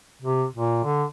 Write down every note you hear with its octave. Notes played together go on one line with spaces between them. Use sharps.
C3
A#2
D3